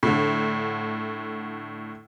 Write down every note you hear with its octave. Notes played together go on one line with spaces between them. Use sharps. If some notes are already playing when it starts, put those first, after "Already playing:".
A2 D3